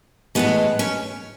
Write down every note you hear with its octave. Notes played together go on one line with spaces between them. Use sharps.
A2 E3 G#3 B3
C#4